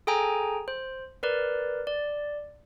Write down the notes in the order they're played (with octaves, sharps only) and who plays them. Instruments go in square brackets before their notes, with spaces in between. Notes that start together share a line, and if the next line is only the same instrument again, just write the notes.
[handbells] G#4 A4 G5 G#5 A#5
C5
A#4 B4 D5
D5